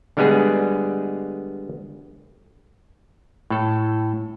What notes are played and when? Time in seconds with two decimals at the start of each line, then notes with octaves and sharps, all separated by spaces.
0.17 D3 G3 G#3 B3 G#4
3.50 A2 A4